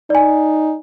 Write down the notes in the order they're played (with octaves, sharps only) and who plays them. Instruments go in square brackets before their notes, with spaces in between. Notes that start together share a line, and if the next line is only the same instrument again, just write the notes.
[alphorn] D#4 [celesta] D5 G#5